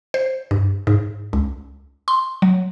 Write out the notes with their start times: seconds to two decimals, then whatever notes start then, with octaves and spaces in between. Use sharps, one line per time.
0.14 C5
0.51 G2
0.87 G#2
1.33 C#2
2.08 C6
2.42 F#3